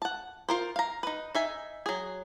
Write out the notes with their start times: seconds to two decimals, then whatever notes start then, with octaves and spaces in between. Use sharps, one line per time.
0.02 F#5 A5
0.49 F4 A#4 C5
0.76 F5 A#5
1.03 D#4 B4
1.35 D#4 E5 G#5
1.86 F#3 G#4